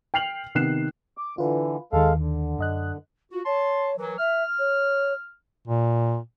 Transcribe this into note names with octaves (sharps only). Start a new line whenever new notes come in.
G5 F6 C7 F7 F#7
C3 D#3 B3 F#6 C7 E7
D6
D3 E3 F4 B4
D#2 D#3 G#3 A4 F5
D3
F#2 D#5 F#6
F4 F#4
C#5 A5 C6
E3 F#3 A#4
E5 F6
C#5
A#2